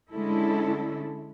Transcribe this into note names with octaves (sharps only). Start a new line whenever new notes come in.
D3 G#3 C#4 E4 A4